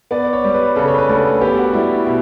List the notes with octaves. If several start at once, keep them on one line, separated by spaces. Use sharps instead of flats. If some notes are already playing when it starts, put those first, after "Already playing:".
B3 D5
C#5
G3
B4
C#3 A4
C#5
B4
D2 A4
B3 G4
F#4
G3 E4
B2